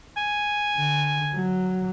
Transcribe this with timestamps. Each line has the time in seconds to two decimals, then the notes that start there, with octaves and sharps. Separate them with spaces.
0.17 G#5
0.76 D3
1.34 F#3